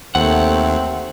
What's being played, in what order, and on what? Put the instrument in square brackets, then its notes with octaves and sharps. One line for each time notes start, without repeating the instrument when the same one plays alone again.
[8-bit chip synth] D#2 [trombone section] A3 [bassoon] C4 [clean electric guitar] F#5